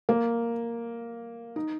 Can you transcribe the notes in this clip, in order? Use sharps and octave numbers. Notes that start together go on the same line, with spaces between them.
A#3
D#4